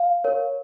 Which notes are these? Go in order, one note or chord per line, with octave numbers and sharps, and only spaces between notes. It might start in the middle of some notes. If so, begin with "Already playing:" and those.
Already playing: F5
A#4 C#5